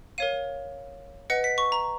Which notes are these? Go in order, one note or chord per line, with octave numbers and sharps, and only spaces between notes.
A#4 C#5 F5 D#7
B4 D#5 F#5 C#7
B6
C#6
A#5